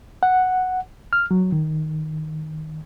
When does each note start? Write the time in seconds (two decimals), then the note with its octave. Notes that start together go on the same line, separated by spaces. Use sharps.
0.23 F#5
1.13 F6
1.31 F#3
1.52 D#3